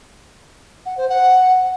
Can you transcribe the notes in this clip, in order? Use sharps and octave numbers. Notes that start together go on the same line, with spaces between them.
F#5
C5
F#5